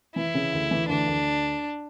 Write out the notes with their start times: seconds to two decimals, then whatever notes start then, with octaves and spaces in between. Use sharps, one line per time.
0.15 E3 E4
0.35 C#3
0.53 D2
0.71 E3
0.89 D2 D4
1.07 D2